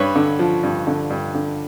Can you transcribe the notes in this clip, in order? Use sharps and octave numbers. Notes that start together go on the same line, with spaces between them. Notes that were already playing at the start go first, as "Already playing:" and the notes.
Already playing: G2 B4 C#5
D3
F3
G2
D3
G2
D3